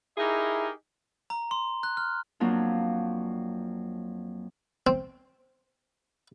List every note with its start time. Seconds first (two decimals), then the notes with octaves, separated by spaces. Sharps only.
0.18 D#4 E4 G4 G#4 A#4 D#5
1.30 A#5
1.51 C6
1.83 F#6
1.97 F6
2.40 F2 F#3 A#3 D4 F4
4.87 C4